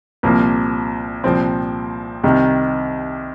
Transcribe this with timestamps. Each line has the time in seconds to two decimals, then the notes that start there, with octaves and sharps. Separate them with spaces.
0.23 C2 A#2 F3 A#3
1.24 C2 A#2 F3 C4
2.24 C2 C3 D#3